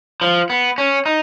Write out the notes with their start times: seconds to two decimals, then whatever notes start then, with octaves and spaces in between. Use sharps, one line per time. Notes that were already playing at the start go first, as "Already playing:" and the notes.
0.22 F3
0.50 B3
0.78 C#4
1.06 D#4